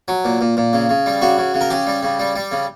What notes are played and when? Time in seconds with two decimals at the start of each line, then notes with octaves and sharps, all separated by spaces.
0.08 F#3
0.25 A#2
0.41 A#2
0.57 A#2
0.73 C#3
0.89 C#3
1.06 G3
1.22 C#3 F#4
1.38 C#3
1.54 C#3
1.61 A#4
1.70 C#3 G4
1.87 G3
2.03 C#3
2.19 G3
2.36 G3
2.52 C#3